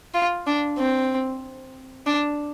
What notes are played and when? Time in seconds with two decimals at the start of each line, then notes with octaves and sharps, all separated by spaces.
0.14 F4
0.47 D4
0.78 C4
2.07 D4